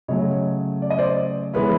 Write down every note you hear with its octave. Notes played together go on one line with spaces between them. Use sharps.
C#3 F#3 A3 C#5 D#5
D5
D#5
C5 D5
E3 G#3 B3 E4 B4 C#5